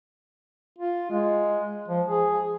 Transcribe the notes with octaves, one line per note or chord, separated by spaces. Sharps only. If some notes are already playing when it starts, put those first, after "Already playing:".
F4
G#3
F3
G#4